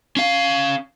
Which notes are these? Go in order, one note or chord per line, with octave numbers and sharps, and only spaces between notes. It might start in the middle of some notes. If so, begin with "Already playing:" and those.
C#4 F5